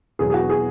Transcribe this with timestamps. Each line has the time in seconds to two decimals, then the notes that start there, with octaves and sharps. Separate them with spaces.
0.19 E2 B2 F#3 G#4
0.30 G#4
0.34 F#4
0.50 G#4